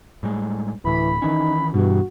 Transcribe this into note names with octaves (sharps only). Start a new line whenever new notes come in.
A2 G3 G#3
D1 A2 E3 B5
D#3 E3 C#4 D#4
G2 B2 E3 F#4